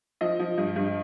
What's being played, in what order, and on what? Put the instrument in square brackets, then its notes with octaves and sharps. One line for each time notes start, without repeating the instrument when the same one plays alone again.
[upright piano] F3 D#5
F3
G2
G2